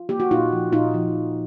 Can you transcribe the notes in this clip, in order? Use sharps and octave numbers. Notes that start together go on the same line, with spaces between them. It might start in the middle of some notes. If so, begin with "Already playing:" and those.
Already playing: F4
A#3 G4
F#4
A#2 D#4 F4
F3
A#2 D#4 F4
F3